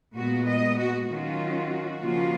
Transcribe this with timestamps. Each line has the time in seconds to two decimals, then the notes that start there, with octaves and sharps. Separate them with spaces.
0.16 A#2 G#3 B3 F#4
0.47 D#5
0.78 F#4
1.08 D#3 F#3 C#4 F4 F#4
2.01 C#3 F3 A#3 C#4 F4